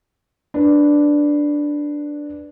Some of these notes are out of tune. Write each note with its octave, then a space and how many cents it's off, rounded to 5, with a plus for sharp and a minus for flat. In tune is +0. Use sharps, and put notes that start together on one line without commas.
D4 +0 B4 +0